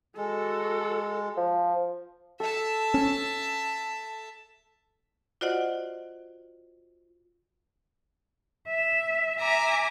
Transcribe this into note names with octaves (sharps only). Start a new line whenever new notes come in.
G#3 F#4 A4
F3
A4 E5 A5
C#4
F4 F#4 C5 D5 D#5 F#5
E5
E5 G#5 A#5 D6